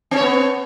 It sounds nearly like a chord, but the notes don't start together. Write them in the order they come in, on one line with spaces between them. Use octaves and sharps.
C4 C#5 B3